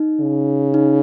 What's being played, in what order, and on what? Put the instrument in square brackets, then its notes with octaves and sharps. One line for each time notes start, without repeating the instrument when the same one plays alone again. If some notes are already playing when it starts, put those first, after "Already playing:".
Already playing: [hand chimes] D#4
[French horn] C#3
[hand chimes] D#4